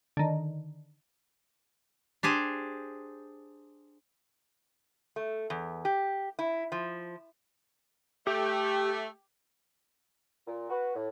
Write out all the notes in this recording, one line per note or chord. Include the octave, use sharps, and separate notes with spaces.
D3 D#3
D4 G4 G#4 C5
A3
E2
G4
E4
F3
A3 G4
A#2
F#4 B4
A2